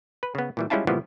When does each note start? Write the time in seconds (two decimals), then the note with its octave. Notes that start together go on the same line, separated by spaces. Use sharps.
0.23 B4
0.35 C#3 B3
0.57 A#2 E3 G3
0.70 G3 G#3 C#4 E4 F4 A5
0.87 A#2 C#3 E3 F3 G3 B3